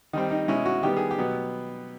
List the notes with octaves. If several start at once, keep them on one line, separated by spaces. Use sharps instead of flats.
D#3 G3 C4 D#4
D#4
B2 G#3 C#4 E4
F#4
D#3 G3 B3 G4
G#4
G4
B2 F#3 B3